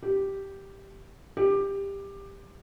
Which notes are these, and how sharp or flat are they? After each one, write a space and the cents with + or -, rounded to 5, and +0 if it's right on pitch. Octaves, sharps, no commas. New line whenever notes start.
G4 -5
G4 +15